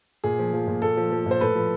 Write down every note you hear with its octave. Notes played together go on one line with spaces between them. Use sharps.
A#2 G#4
F3
F3
A#2
A#2 A4
F3
F3
A#2 C5
A2 A4 B4
F3